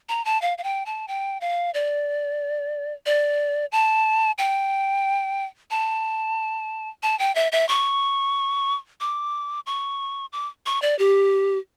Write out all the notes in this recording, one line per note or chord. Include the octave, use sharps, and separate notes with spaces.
A#5
A5
F5
F5
G5
A5
G5
F5
D5
D5
A5
G5
A5
A5
G5
E5
E5
C#6
D6
C#6
D6
C#6
D5
G4